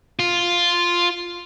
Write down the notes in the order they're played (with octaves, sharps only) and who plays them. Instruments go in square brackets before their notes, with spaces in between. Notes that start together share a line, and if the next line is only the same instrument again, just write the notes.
[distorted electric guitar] F4